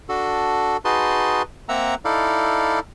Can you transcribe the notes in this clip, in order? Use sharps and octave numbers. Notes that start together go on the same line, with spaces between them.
D4 F#4 A4
D#4 F#4 G#4 B4 A5 C6
A#3 C4 E5 F#5 A#5 E6
D#4 E4 A4 D5 F5